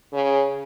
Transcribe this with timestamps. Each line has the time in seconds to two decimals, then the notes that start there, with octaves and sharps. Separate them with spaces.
0.13 C#3